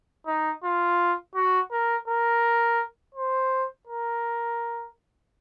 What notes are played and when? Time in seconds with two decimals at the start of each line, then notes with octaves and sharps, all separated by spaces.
0.27 D#4
0.64 F4
1.35 F#4
1.71 A#4
2.08 A#4
3.15 C5
3.87 A#4